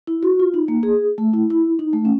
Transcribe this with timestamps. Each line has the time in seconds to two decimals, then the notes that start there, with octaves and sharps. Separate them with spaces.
0.07 E4
0.23 F#4
0.39 F4
0.54 D#4
0.68 A#3
0.83 G#4
1.18 A3
1.34 E4
1.50 E4
1.79 D#4
1.93 A3
2.05 C#4